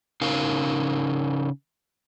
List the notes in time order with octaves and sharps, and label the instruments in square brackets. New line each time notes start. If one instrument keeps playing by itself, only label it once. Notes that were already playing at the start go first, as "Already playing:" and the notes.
[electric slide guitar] C#3 D#4 A#4 F5